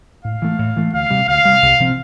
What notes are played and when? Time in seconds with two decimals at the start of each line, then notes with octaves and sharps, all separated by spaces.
0.25 A2 F5
0.42 E3 A3
0.59 A2
0.76 E3 A3
0.93 D2 F5
1.10 C3 G3
1.28 D2 F5
1.45 C3 G3
1.62 C2
1.80 C3 F3 C4